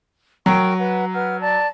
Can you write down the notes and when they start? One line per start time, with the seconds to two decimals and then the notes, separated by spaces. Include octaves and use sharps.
0.46 F#3 A#4 G5 C#6
0.79 B4 F#5
1.14 B4 F#5 F6
1.40 D5 A5